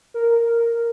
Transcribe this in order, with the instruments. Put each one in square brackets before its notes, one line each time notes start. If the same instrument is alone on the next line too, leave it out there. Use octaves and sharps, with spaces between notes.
[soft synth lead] A#4